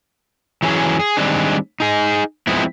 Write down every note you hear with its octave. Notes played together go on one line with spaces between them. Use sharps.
E3 F#3 C#4 G#4
G#4
D#3 G3 G#3 C4 D4
D#4 G#4
F3 G#3 B3 C4 E4